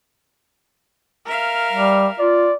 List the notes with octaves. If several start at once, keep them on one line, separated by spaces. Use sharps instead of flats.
A#4 E5 F5
G3
F4 D5